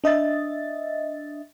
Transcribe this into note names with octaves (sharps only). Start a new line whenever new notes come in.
D4 D#5 E5 A6